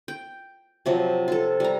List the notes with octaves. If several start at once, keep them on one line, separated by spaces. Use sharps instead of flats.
G5
C3 F3 F#3
F4 A4
G3 A#5